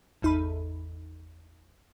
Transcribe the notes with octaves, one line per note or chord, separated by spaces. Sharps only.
G#1 E2 D#4 A4 B5